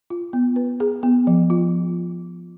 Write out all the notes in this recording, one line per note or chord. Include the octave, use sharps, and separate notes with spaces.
F4
B3
B4
G#4
B3
F3
F4